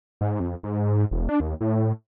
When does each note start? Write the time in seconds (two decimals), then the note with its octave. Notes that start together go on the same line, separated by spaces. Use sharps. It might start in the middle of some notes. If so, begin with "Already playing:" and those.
0.21 G#2
0.40 F2
0.63 G#2
1.11 E1
1.29 D4
1.40 D#2
1.61 A2